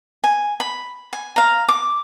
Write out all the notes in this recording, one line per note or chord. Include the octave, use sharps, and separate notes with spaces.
G#5
B5
G#5
F5 A#5
D6